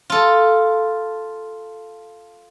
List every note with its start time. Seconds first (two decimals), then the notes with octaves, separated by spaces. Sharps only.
0.10 F4 A4